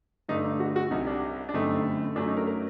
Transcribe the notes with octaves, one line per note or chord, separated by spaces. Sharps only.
G2 D3 A3 D4 D#4
D#4
F#4
F#4
C2 C3 G3 D#4
D4
D4
G1 F#2 D3 A3 C4 D#4
F#2 F#3 A3 D4
D#4
A#4
A#4